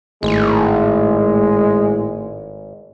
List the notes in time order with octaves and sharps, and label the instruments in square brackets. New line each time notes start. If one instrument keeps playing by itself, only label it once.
[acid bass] G#1 [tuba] A2 [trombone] G#3